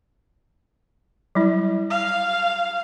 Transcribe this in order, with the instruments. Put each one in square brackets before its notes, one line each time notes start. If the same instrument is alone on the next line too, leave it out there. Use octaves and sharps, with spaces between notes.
[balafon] F#3 G3 E4
[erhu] F5